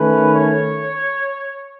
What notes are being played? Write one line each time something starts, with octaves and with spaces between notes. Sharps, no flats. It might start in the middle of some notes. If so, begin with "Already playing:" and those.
Already playing: D#3 A3 C#4 B4
C#5